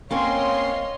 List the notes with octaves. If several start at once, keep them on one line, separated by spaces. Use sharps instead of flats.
A#3 C4 C#4 C#5 D#5 F5 C6